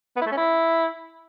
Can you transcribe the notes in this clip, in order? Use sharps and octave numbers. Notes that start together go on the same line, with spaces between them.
B3
E4
A3
C#4
E4